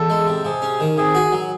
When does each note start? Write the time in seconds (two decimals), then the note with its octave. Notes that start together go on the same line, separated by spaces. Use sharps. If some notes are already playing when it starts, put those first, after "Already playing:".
Already playing: E2 A4
0.10 G#3
0.27 C3
0.45 C3 G#4
0.62 C#4
0.80 D#3
0.98 C3 G#4
1.15 F#4
1.32 F#3